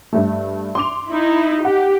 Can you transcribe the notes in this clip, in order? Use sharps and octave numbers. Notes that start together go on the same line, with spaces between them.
G2 A3
C6 D6 F7
D#4 E4
G4 F#5